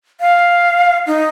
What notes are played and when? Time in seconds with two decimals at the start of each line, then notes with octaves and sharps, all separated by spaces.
0.21 F5
1.07 D#4